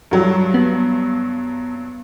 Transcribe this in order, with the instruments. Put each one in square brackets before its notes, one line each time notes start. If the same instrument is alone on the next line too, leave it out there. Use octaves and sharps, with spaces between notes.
[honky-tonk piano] G2 F#3
[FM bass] B3